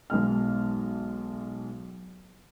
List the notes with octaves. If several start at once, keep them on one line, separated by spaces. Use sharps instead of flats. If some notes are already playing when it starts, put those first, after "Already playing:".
B1 G#3 F6